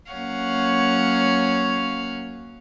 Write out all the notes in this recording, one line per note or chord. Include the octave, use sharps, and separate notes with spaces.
F#3 A#3 C#4 C#5 F5 F#5